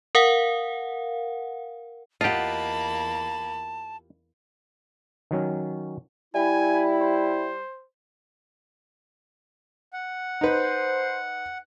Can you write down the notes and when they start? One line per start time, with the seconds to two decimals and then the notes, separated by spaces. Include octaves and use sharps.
0.15 A#4 F5 F#5
2.21 E2 A#3 F4 G4 D#5 F#5 A5 B5
5.31 D#3 F#3 C#4
6.35 G3 E4 G#5
7.01 C5
9.93 F#5
10.41 D#4 B4 C5